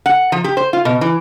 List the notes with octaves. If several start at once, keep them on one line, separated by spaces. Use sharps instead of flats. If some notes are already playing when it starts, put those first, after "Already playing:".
F#5
F3
G4
C5
F4
B2
E3